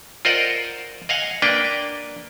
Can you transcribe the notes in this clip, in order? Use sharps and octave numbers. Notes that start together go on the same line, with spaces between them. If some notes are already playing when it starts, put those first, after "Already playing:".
F4 A#4 C5 D5 D#5 F#5
D#5 F5 F#5 G#5
A#3 D4 B4 D5 G5